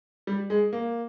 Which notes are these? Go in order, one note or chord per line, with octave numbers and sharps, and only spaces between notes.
G3
G#3
A#3